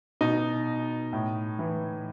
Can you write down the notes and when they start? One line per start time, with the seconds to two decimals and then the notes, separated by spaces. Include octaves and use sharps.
0.21 B2 D#4
1.13 A2
1.59 E3